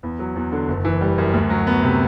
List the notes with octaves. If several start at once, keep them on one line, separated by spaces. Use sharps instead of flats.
E2
F#3
E2
D3
F#1
E3
G3
F#2
D2
F#3
B3
C3